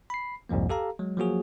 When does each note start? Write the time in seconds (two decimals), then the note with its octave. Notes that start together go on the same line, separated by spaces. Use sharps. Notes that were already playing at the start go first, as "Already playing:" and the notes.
0.10 B5 C7
0.49 C2 F2 G#2 F3 A#3
0.70 G4 A4 F5 A#5
0.99 F#3 G#3
1.17 F3 F#3 A#3 F#4 G#4